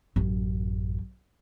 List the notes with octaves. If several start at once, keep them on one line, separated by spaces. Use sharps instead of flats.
A1 F#2